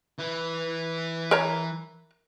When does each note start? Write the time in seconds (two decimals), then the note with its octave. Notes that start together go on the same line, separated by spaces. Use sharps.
0.18 E3
1.31 A#4 C#5 A#5